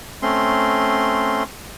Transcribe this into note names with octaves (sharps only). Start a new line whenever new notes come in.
A3 C4 C#4 C6